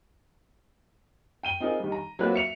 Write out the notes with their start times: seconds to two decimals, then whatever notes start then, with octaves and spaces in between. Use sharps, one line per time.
1.43 G5 D#7 G7
1.60 C4 D#4 F4 G#4 A#4
1.80 D#3 G3
1.92 A#5
2.19 F#3 A#3 C4 F4 F#4 B4
2.34 E5 C#7 F7